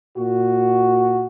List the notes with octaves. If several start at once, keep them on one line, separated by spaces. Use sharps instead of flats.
A#2 F#4